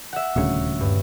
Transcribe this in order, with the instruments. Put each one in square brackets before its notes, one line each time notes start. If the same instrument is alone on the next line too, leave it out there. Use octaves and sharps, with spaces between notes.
[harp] E5 F#5
[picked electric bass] D#1 D2 C#3 [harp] C#5
[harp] G2